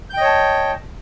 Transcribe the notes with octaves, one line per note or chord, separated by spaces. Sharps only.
C#5 D#5 G5 A5 G6